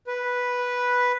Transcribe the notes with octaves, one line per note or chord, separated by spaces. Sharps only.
B4